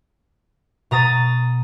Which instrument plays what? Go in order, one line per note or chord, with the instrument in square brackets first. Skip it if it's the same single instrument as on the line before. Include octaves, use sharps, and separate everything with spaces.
[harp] B2 A#5 D#6 A6